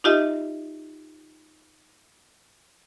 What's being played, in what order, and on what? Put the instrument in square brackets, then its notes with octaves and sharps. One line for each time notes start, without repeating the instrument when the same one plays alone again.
[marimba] D#4 F4 G4 D#5 E5